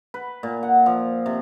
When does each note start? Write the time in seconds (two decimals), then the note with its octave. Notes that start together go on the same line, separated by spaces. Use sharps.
0.14 B4
0.43 A#2
0.63 F#5
0.86 F3
1.26 C3